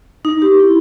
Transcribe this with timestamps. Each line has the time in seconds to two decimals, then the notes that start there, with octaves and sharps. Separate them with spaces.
0.25 D#4
0.42 G4
0.60 E4